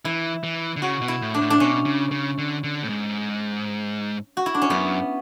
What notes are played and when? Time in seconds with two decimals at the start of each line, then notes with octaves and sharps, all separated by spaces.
0.05 E3 E4
0.44 E3
0.76 D3
0.82 C#3 F#4
1.02 B2
1.08 E4
1.22 A2
1.34 D4
1.41 A2
1.50 D4
1.60 B2 C#4
1.86 C#3
2.12 C#3
2.38 D3
2.64 D3
2.83 A2
2.89 G#2
4.37 F#4
4.46 E4
4.54 D4
4.62 C#4
4.70 F#2 B3